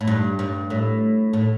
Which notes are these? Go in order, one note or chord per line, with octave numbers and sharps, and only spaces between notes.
A2
G2
G2
A2
A2